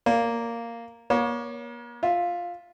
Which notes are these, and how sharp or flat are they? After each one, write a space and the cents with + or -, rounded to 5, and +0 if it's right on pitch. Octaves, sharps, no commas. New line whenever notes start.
A#3 -5 D5 -35
A#3 +40 C#5 +20
F4 +5 E5 +0